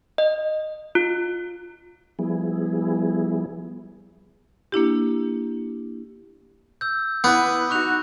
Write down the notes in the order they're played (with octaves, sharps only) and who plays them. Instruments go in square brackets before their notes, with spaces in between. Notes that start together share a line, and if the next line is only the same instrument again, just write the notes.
[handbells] D#5
F4
[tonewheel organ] F3 G3 B3 E4 G#4
[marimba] A#3 D4 E4 G4
[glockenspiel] E6 G6
[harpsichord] B3 [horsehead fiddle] E4 B4 [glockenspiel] B5 D6
[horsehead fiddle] D#4 F#4 [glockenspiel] C#6 F#6 F7